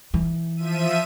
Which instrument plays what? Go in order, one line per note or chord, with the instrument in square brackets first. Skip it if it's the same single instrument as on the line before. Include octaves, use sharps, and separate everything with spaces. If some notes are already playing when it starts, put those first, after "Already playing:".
[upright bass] E3
[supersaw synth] F3 E5 D#7